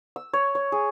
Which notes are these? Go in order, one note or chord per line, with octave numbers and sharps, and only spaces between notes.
E6
C#5
C#5
G#4